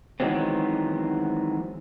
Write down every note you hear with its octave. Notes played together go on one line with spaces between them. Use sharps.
D#3 E3 F#3 G#3 B3 C4